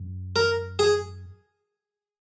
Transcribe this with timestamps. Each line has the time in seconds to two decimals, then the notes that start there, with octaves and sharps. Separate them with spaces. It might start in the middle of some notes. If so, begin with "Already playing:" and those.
Already playing: F#2
0.36 A#4
0.79 G#4